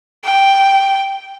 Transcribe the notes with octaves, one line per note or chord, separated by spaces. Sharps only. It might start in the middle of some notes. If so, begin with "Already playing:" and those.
G5